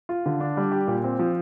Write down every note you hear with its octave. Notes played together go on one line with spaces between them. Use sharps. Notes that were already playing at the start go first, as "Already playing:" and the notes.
F4
D3
D4
G3
G4
A#2
C4
F3